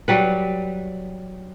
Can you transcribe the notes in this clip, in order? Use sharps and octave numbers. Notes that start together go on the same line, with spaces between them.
F#3 G3 B4